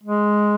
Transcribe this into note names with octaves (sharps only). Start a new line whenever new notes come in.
G#3